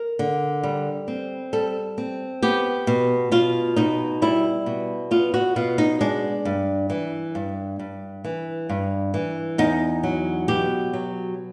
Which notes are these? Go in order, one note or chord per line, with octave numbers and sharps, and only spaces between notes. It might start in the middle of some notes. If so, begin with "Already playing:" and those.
Already playing: A#4
D3
G3
C4
G3 A4
C4
B3 G4
B2
B2 F4
B2 D#4
G3 E4
B2
B3 F4
F#4
B2 F4
D#4
G#3 D4
G2
E3
G2
G2
E3
G2
E3
E2 D#4
F#3
B2 G4
F#3